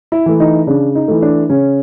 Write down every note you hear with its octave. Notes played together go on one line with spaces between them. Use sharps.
E4
E3 A3
D#4
C#3 D4
D#4
E3 A3
D4
C#3 C#4